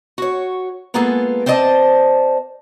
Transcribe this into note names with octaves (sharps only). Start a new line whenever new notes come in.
F#4 C#5
G#3 A#3 B3 F4 G#4 A4
C4 C5 D5 D#5 A5